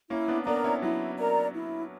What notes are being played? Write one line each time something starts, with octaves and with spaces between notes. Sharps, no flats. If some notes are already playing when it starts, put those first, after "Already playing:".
A#3 C#4 E4
B3 D4
B3 D4 A#4 D5 A#5
C#4 E4
F#3 E4
A#4 D5 A#5
E4